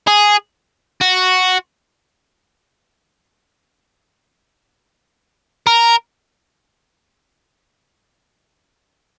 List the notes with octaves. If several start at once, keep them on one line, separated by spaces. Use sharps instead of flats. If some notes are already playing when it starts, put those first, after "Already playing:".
G#4
F#4
A#4